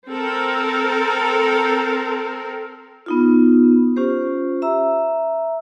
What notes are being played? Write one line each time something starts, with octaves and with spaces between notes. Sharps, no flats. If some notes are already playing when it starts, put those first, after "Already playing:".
C4 A4 A#4
B3 D#4 F4
C#4 F4 G4 C5
E5 A#5 E6